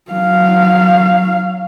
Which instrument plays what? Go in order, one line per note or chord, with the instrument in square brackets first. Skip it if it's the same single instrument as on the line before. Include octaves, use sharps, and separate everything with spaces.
[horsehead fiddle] F#3 F5